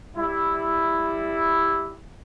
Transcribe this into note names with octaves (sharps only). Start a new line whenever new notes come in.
G3 E4